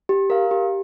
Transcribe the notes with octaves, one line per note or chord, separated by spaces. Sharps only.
G4
A#4 F5
G4